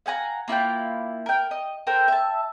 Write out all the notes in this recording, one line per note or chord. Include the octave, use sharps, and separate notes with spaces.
F5 F#5 G#5 A#5
A#3 E4 F4 G5
A#4 G5
D#5
A4 A#4 C5 G5
E5 A5